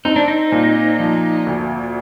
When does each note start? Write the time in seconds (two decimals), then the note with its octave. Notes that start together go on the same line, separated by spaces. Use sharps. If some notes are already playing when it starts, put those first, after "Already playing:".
0.05 C4 D#4
0.16 D4
0.28 D#4
0.52 A#2
0.99 F3
1.46 D2